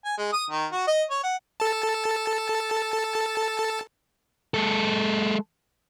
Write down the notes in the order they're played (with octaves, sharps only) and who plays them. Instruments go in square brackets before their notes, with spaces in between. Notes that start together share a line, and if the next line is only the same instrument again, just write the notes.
[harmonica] G#5
G#3
D#6
D#3
F#4
D#5
C#5
F#5
[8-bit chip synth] A4 A5
[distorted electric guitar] G#3 A4